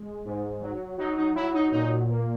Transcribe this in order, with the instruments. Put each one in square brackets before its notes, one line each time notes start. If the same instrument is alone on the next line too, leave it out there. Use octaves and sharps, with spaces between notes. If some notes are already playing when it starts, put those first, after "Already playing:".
Already playing: [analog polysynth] G#3
G#2
F#3
F#3 D#4
D#4
F#3 E4
D#4
A#2 D#4
A#3